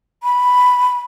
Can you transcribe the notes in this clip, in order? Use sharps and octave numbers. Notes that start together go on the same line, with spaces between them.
B5